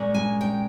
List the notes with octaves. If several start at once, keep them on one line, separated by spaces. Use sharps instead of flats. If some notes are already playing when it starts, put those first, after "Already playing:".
Already playing: A#2 G#3 C#4
G#5
G5